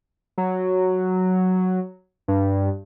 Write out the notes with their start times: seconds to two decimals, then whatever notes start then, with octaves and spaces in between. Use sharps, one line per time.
0.38 F#3
2.28 G2